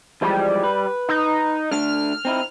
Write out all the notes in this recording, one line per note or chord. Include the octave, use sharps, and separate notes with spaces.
E3 F3 G3 G#3
B4
D#4
D3 A3 D4 F6
C4 D#4 E4